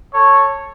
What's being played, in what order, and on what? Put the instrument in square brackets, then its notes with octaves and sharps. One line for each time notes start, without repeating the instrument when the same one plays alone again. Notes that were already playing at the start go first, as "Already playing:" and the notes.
[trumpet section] A4 C#5